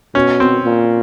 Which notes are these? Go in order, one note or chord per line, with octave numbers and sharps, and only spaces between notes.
B2 C#4
C4
A#2